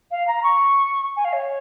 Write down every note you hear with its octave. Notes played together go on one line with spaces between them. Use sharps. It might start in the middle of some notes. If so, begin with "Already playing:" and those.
F5
A#5
C#6
G#5
F5
C#5